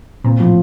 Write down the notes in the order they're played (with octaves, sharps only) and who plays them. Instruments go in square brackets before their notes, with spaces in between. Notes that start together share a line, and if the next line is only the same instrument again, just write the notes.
[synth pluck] A#2 [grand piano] C4
[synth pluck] A2 [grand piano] F3